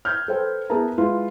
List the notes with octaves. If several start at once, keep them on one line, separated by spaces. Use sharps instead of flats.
F6 G6 G#6
A4 B4 C5 G5
B3 E4 G#4 A#4 A5 A#5
G#3 E4 F4 B4